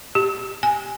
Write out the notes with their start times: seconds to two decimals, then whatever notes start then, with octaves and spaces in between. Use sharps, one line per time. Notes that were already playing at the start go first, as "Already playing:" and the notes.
0.15 G4
0.63 G#5